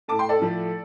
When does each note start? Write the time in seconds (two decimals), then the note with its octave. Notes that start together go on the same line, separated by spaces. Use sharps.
0.08 A3 A5 D6
0.12 A2
0.19 G5 C6
0.29 A4 D5
0.40 A2 F3 A3